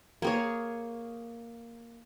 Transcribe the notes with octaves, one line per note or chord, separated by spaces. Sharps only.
A#3 G#4 C#5